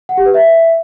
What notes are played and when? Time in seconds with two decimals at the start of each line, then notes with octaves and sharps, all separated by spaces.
0.09 F#5
0.17 G4
0.26 B4
0.34 E5